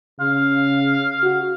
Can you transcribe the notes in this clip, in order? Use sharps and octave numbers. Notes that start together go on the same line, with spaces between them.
C#3 F5
F#4